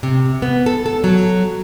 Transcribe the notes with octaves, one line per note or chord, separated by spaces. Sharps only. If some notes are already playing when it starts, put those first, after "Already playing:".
C3
B3
A4
A4
F#3